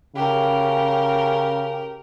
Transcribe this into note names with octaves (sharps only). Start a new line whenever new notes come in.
C#3 G4 A#4